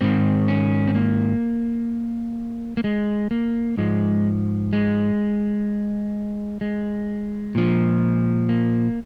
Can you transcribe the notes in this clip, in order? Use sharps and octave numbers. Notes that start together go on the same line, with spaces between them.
G#2 D#3 C4
C#4
C4
A#3
A#3
G#3
A#3
G#2 F3 G#3
G#3
G#3
A#2 F3
A#3